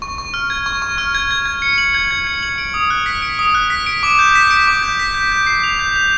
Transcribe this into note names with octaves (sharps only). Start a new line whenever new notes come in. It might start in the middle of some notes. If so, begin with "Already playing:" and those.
C#6
C#6
F6
G#6
C#6
C#6
F6
G#6
G#6
G#6
C#7
F#7
G#6
G#6
C#7
F#7
D7
D#6
F#6
B6
D7
D#6
F#6
B6
D7
D6
G6
B6
D7
D6
G6
B6
G6
G6
C7
F7
G6
G6